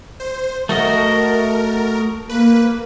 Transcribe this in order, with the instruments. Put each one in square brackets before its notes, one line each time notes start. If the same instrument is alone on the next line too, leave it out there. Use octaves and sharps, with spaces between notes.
[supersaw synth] C5
[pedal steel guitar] A3 F#4 D#5 [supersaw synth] A#4
[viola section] A#3 [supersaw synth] B4